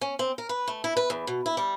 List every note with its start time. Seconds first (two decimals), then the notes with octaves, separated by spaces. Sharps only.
0.01 C#4
0.19 C4
0.38 A#4
0.49 B4
0.68 A3
0.84 E4
0.97 B4
1.10 E2
1.27 B2
1.46 E4
1.57 G3